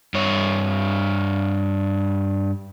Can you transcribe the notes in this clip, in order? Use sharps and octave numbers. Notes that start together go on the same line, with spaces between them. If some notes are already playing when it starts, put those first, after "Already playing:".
G2 C#5